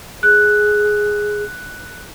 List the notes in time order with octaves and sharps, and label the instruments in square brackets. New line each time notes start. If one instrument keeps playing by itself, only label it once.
[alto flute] G#4 [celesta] F#6